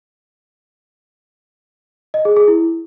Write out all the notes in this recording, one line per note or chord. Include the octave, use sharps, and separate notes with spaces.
D#5
G#4
G#4
E4